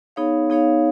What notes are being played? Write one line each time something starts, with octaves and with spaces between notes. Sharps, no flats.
B3 D#4 G#4 C#5 F5
B3 D#4 G#4 C#5 F5